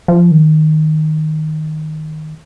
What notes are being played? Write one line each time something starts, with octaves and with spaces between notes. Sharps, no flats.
F3
D#3